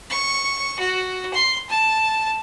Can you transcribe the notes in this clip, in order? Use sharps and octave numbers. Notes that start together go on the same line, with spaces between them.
C#6
F#4
C6
A5